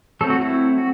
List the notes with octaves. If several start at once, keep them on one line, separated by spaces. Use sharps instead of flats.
F#3 A3 C4 A4
F#4
E4
F#4